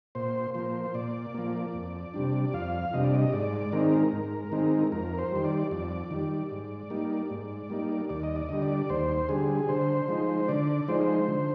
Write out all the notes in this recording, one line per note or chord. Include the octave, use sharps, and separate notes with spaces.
A#2 C5
F3 A#3 C5
A#2 D5
F3 A#3
F2
C3 G3 D4
F2 F5
C3 G3 D4 D#5
D5
D#5
G#2 D5
D#3 G#3 C4 D#4 A#4
G#2
D#3 G#3 C4 D#4
F2 A#4
C5
D#3 G3
D5
F2 D5
D#3 G3
G#2
G3 A#3 D#4
G#2
G3 A#3 D#4
D#2 D5
D#5
D5
D3 G3 D#5
D5
D#2 C5
D3 G3 G#4
D3 C5
F3 G#3 D#4
D3 D5
F3 G#3 D#4 C5
D3